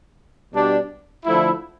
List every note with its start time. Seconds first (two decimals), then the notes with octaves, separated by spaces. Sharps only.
0.53 B2 G3 D4 G4
1.25 D3 F3 A3 E4